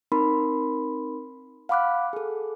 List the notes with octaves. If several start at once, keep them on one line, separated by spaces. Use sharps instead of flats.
C4 D#4 A#4 B5 C6
F5 F#5 B5 D6 F6 F#6
G#4 A4